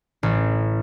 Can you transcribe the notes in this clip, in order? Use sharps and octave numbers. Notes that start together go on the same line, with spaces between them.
A1